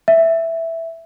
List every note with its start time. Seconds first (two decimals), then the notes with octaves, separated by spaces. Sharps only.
0.08 E5